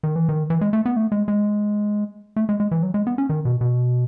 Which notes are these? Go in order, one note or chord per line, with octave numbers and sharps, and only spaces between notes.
D#3
E3
D#3
E3
G#3
A3
B3
A3
G#3
G#3
A3
G#3
G#3
E3
F#3
G#3
B3
C#4
D#3
B2
B2